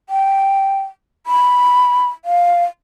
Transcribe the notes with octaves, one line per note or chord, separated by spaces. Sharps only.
G5
B5
F5